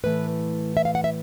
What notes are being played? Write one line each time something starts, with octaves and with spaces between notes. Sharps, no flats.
A2 E3 A3 B4
E5
F5
F#5
E5